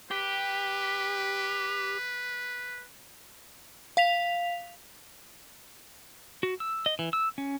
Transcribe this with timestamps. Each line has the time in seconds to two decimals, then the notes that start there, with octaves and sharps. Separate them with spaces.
0.11 G4 B4
3.97 F5 B6 F7
6.43 F#4
6.60 E6
6.86 D#5
6.99 E3
7.13 E6
7.38 C#4